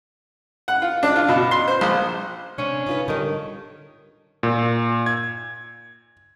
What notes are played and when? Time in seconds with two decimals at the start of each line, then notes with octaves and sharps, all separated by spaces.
0.68 F#5
0.82 F4
1.03 D4
1.16 F4
1.28 B2
1.51 C6
1.68 C5
1.81 A#1
2.58 C3 C#4 D4
2.87 D#4 F4 B4
3.08 D3 D#3 G3
4.43 A#2
5.06 G#6